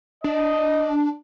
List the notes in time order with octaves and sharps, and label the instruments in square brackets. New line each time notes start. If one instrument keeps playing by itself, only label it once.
[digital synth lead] D4 [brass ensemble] D#5